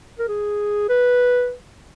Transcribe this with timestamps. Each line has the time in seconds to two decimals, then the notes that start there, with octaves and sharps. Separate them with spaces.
0.19 A#4
0.28 G#4
0.89 B4